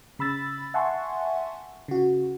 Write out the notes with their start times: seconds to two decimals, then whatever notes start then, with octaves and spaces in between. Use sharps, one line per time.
0.19 C#3 B5 E6 A6
0.74 E5 F#5 G#5 A5 C6 C#6
1.88 C#3 F#4